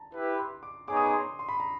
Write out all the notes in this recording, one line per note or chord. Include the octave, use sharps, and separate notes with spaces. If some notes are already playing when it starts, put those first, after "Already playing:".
Already playing: A5 A#5
E4 G4 B4
C6
D6
B3 D#4 G#4 C#5 D6
D#6
D6
C6
C6
B5
A#5